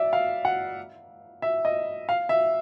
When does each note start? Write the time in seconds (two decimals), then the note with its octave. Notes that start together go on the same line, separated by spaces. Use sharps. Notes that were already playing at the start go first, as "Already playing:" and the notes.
Already playing: D5 E5
0.13 F5
0.45 F#5
1.42 E5
1.65 D#5
2.09 F5
2.29 E5